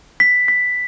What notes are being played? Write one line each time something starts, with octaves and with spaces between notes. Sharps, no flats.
B6
B6